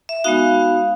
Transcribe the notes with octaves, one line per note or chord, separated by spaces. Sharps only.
E5
G#3 B3 D#4 F#4 F5